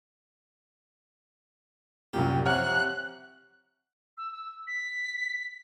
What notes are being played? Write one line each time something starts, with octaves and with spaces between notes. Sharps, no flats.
C2 F#2 A#2 G4
C2 C3 F3 C#5 F#5 F6 F#6
E6
E6
B6